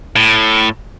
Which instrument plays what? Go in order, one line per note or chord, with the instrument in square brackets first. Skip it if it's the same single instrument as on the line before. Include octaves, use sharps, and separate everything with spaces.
[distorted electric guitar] A2